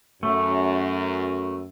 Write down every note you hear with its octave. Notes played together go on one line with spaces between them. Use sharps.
F#2 A3